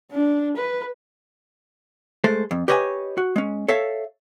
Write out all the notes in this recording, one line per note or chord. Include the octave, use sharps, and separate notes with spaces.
D4
B4
G#3 A3 A4 C5
F2
G4 B4 C#5 D#5 F5 G#5
F#4
G#3 C#4
A4 C#5 E5 F5